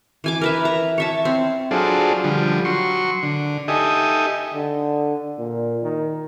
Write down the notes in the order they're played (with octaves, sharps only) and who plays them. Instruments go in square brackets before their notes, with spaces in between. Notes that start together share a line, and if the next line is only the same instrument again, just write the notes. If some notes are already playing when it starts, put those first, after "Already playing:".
[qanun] E3 G#5 D6
A#4 B4 E5
A#5
C#5 E5 A5
C4
[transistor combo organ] F#3 D4 F4 G#4 A4 C5
D3 F3 G3
F#3 C6 C#6
D3
D#4 G4 A4 D#5 E5 G#5
[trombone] D3
A#2
D#3